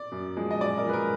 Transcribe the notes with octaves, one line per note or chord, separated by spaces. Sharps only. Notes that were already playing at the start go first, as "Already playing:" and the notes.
Already playing: D5
F#2
F3 G#3
D#5
F#2 D5
A#4
F3 G#3 B4
A#4